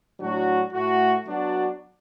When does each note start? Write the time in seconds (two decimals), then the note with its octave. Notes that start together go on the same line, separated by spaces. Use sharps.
0.18 A2 F#3 D4 F#4
0.71 A2 A3 F#4
1.24 F#3 B3 D4 F#4